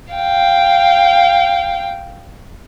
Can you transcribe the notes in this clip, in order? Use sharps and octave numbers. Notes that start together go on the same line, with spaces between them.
F5 G5